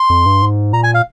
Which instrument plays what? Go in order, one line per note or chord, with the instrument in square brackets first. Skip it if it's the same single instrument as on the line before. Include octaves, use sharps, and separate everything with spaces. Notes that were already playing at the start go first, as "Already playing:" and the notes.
Already playing: [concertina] C6
[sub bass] F2
G2
G#2
[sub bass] A#2 [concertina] A#5
[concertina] G#5
F5